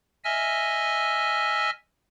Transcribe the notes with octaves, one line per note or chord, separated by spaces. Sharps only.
D#5 E5 G#5 E6 F6